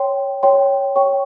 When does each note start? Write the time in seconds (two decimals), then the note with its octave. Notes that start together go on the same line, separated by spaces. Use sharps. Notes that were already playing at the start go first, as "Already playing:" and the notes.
Already playing: C#5 G5 C6
0.43 C#5 G5 C6
0.96 C#5 G5 C#6